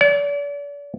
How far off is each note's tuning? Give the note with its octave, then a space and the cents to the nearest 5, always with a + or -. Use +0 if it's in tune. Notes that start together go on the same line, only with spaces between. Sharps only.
D5 -40